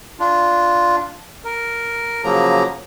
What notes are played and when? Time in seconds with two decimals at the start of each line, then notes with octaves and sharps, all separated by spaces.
0.20 D4 F4
1.44 A#4
2.24 C#3 F3 F#3 A#3 A#5